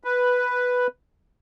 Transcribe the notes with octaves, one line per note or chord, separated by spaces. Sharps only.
B4